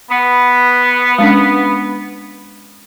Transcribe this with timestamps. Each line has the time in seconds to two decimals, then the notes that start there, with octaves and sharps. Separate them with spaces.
0.11 B3
1.18 G#3 C#4 D4